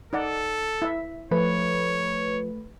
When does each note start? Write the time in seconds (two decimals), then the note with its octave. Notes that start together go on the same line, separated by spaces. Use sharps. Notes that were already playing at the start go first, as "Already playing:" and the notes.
0.13 D#4 A4 D5 F#5
0.82 E4 E5
1.31 F3 A3 B4 C#5